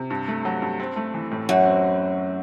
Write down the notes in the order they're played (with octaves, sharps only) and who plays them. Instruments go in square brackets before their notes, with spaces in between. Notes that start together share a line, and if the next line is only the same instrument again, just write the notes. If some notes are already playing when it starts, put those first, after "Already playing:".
Already playing: [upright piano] C3
G2
A3
F#3
G2
C4
A3
E3
A2
[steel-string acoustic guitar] F#2 [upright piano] F#4
[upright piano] C4